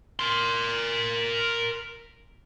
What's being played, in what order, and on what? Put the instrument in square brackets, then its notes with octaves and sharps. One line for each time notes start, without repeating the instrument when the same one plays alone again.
[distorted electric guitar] A#4 C6